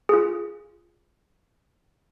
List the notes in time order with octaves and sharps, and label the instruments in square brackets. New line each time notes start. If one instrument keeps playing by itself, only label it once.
[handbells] F4 G#4